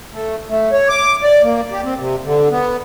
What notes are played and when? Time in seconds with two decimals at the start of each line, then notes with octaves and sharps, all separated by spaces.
0.13 A3
0.49 A3
0.72 C#5
0.88 D6
1.23 D5
1.43 A#3
1.71 G4
1.84 C4
1.98 C3
2.25 D3
2.50 B3